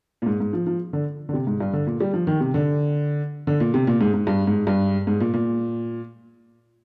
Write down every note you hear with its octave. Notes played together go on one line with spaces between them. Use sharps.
A#2
G#2
G#2
F3
F3
D3
D3
C3
G#2
G2
D3
A#2
G3
F3
D#3
C3
D3
D3
A#2
C3
A#2
G#2
G#2
G2
G#2
G2
G#2
A#2
A#2